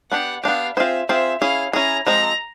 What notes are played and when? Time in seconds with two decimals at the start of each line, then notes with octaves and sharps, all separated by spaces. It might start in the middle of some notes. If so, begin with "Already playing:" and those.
0.11 B3 D4 G4 F#5
0.44 B3 D4 G4 F5
0.77 C4 F4 G#4 C5 E5
1.09 C4 F4 G#4 C5 E5
1.41 C#4 E4 G#4 F5
1.73 C#4 E4 G#4 A#5
2.07 F3 G#3 C4 A#5